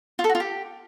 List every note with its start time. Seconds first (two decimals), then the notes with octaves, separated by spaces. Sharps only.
0.19 F4
0.24 A4
0.29 F#4
0.35 F4
0.40 G4